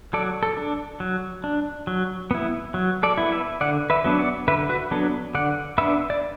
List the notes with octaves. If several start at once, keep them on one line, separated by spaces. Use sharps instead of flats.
F#3 A4 D5
A4
D4
F#3
D4
F#3
B3 E4
F#3
A4 D5
B3 E4
B4 E5
D3 D5 F#5
B4 E5
F#3 B3 D4
D5 F#5
D3 B4 E5
F#4 B4
F#3 B3 D4 A4
D3 D5 F#5
B3 D4 B4 E5
D5